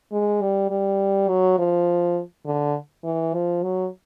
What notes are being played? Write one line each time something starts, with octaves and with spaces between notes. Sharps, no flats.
G#3
G3
G3
F#3
F3
D3
E3
F3
F#3